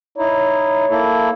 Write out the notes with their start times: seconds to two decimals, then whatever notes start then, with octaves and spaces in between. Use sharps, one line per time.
0.18 D#4 E4 C#5
0.90 A#3 E4 A4